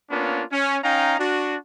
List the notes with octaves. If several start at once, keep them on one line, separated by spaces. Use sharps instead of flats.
A#3 B3 C#4 D4 F4
C#4
C#4 D#4 F5 G5 A#5
D4 F#4